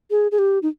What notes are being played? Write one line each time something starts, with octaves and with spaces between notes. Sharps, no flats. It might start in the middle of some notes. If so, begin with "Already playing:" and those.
G#4
G#4
G4
D#4